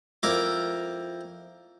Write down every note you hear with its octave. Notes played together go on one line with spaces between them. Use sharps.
F2 E4 A#4 A#5 D6